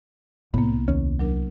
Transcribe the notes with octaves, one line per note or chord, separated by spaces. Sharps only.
C2 A2 A#3 B3
D#2 C#4
F#3 D4 A#4